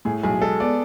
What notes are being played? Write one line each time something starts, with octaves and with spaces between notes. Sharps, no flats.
A2 G#4
B1 G#4
G#3 A4
B3 D5